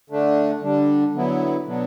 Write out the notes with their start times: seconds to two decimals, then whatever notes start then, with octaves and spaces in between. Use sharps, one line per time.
0.10 D3 A3 D4
0.62 D3 G3 D4
1.14 D3 F#3 B3 E4
1.67 B2 F#3 B3 D4